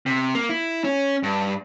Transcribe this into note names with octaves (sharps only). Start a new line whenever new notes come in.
C3
A#3
E4
C#4
G2